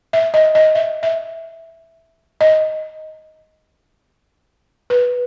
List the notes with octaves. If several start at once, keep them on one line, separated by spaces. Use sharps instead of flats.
E5
D#5
D#5
E5
E5
D#5
B4